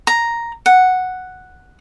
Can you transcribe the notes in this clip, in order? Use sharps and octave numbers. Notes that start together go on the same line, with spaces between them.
A#5
F#5